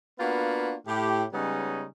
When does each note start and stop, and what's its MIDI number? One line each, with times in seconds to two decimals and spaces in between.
0.19 0.75 58
0.19 0.75 59
0.19 0.75 62
0.19 0.75 65
0.19 0.75 66
0.19 0.75 71
0.87 1.24 45
0.87 1.24 67
1.33 1.86 49
1.33 1.86 55
1.33 1.86 56
1.33 1.86 59
1.33 1.86 61
1.33 1.86 63